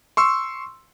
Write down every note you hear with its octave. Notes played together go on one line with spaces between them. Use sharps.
C6 C#6 E6